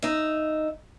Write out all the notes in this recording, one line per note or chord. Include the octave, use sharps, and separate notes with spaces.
D#4 E5